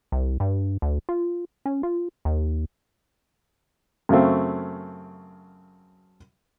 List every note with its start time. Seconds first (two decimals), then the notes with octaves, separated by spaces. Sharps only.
0.12 C2
0.40 G2
0.82 D2
1.09 F4
1.66 C#4
1.83 F4
2.25 D#2
4.09 F#2 C#3 F#3 A3 C4